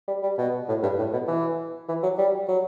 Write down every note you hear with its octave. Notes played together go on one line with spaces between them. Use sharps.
G3
G3
B2
A2
G2
A2
B2
E3
E3
F#3
G3
F#3